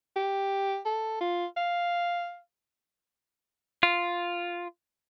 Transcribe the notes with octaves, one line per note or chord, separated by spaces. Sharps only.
G4
A4
F4
F5
F4